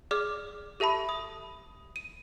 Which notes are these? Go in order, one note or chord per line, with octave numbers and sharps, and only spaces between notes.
G#4 D5 D6 F6
G4 A4 E5 A5 B5
D#6
D#7